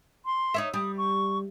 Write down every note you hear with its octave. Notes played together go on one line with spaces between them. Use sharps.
C6
D#4 C#5 E5
G3 D#6
C#6